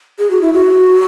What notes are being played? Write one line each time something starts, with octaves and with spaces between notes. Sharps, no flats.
G#4
F#4
E4
F#4